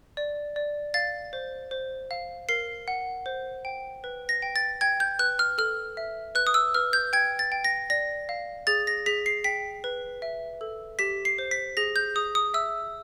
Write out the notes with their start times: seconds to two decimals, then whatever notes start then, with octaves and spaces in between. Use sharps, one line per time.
0.17 D5
0.56 D5
0.94 F5 A6
1.33 C5
1.71 C5
2.11 F5
2.49 A#4 C7
2.88 F#5
3.26 C5
3.65 G5
4.04 B4
4.29 A#6
4.42 G5
4.56 A6
4.81 G5 G#6
5.00 G6
5.19 B4 F#6
5.39 F6
5.58 A4 F6
5.97 E5
6.35 B4 F#6
6.47 D#6
6.54 E6
6.74 B4 F6
6.93 G6
7.13 G5 G#6
7.39 A6
7.52 G5
7.64 A#6
7.90 D5 A#6
8.29 F5
8.67 G#4 A6
8.87 A#6
9.06 G#4 B6
9.26 C7
9.44 G5 B6
9.84 B4
10.22 E5
10.61 A4
10.99 G4 B6
11.25 C7
11.38 C5
11.51 B6
11.77 G#4 A#6
11.96 G6
12.15 G#4 D#6
12.35 D#6
12.54 E5 E6